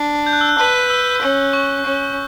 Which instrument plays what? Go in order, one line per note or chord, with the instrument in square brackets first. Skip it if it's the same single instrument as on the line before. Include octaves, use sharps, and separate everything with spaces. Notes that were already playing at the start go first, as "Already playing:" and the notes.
Already playing: [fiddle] D4
[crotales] G6
F#6
E6
F#6
[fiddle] B4
[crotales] E6
[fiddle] C#4
[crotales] C#6
[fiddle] C#4